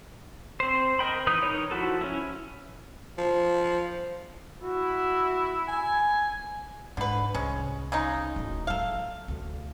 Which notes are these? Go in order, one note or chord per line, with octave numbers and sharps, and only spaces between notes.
C4 C5
A#4 D#5 G5 B5
E3 D#4 B4 D#6 G6
D#4 A#4 C#5
F3 E4 F#4 A4
C#4 E4
F3
E4 F#4
G#5
G#2 D3 B4
C2 G#3 C#4
C#3 G#3 D#4
D1 A2
F#3 G#3 A4 F5
D2 D3